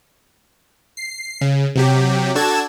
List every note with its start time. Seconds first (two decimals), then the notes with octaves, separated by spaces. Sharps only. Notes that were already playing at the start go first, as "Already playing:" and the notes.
0.97 C7
1.41 C#3
1.75 C3 F#3 G4
2.35 D4 F#4 A4 A5 G#6 E7